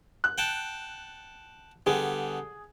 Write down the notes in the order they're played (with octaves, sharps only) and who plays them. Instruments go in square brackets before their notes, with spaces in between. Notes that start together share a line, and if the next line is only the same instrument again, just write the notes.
[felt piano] F#6
[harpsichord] F#5 G5 A5
[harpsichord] D3 G3 B3 [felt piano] G#4